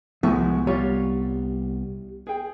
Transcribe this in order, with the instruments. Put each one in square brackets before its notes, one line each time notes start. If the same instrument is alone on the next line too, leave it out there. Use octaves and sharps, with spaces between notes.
[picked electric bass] C2 B3 [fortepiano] A2 E5 C#6 [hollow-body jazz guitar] F3 G#3
[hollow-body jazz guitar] G3 [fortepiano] F4 C#5
[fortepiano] G#4 G5